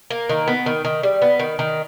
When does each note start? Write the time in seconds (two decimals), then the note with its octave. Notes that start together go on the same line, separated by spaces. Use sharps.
0.10 A#3
0.29 D#3
0.48 B3
0.66 D#3
0.85 D#3
1.03 G3
1.22 B3
1.39 D#3
1.59 D#3